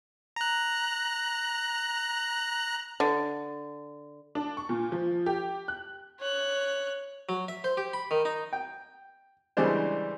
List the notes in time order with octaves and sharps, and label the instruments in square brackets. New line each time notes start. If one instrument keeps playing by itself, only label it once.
[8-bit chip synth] A#5 F#6
[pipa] D3
[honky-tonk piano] D4
C#6
A#2
F3
G4
F#6
[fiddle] C#5 F#6
[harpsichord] F#3
E5
C5
G4
B5
D#3
D#4
[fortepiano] G5
C#3 E3 G3 G#3 D4 C5